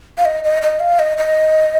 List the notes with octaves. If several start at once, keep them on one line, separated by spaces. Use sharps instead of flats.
F5
D#5
D#5
D#5
F5
D#5
D#5